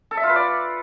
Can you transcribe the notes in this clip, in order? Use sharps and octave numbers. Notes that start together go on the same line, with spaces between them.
A4
E5
F4
B4
D5